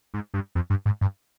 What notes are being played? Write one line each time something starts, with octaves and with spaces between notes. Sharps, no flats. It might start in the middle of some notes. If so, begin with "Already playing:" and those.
G#2
G2
F2
G2
G#2
G2